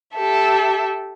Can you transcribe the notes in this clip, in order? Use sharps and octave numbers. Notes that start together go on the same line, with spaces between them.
G4 A4 E5